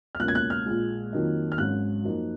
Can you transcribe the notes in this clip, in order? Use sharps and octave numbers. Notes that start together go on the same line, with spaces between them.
F6
C#2 B2 A#3 C#4 F#6
G#6
F#6
F6
A#1 A#2 G#3
F2 D#3 F#3 A#3 D#4
F6
G#1 G#2 F#3 C#4 F#6
F#2 F3 A#3 D#4